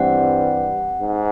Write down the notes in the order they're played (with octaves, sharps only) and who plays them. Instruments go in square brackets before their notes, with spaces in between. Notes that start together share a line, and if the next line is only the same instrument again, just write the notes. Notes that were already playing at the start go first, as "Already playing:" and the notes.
Already playing: [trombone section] G2 E3 G3 C4 [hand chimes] F#5
[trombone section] G#2